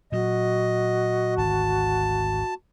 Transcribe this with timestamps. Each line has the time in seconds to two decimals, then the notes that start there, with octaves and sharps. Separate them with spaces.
0.12 A#2 F#3 F#4 D#5
1.38 G#1 D2 A5